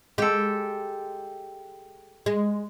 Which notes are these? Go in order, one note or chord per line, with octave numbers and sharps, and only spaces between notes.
G#3 G4 A4
G#3